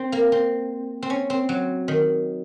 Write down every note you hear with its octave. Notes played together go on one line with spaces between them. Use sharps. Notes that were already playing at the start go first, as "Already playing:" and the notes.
Already playing: C4
A#3
C4
C4
C#4
C4
F#3
D#3